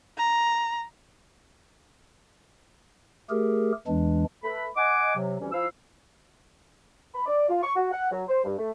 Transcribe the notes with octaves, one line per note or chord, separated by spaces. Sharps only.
A#5
A3 G4 G#4 A#4
E2 E3 G#3 D4
A3 A4 B4 B5
D#5 F#5 G#5 D6
C3 F#3
D2 C3 E3 G3 C#4
F3 E4 F5 E6
B5
D5
F4
C#6
F#4
F#5
F#3
C5
G2
A3